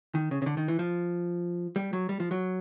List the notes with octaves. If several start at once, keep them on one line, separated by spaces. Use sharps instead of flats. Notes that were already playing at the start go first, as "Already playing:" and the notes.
D#3
C#3
C#3
D3
D#3
E3
F3
G3
F#3
G3
F3
F#3